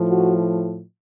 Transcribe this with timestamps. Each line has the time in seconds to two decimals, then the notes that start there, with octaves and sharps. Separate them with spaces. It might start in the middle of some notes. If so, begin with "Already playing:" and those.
Already playing: A2 F3
0.09 F#4